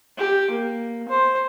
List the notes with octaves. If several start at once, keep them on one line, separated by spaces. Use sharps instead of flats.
G4
A#3
C5